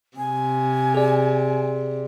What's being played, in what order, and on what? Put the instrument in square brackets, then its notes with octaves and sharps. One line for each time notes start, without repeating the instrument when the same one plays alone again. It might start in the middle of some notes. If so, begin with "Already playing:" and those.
[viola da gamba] C3 [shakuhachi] G#5
[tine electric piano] G#4 D5